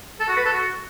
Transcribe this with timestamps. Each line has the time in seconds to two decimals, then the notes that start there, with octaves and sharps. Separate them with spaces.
0.20 A4
0.28 F#4
0.37 B4
0.45 A4
0.53 F#4